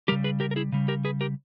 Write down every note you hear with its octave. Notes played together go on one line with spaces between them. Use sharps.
C#3 G3 G4 A#4
G#4 B4
G4 A#4
A#4
E4 G#4
C#3 G3
G4 A#4
G#4 B4
G4 A#4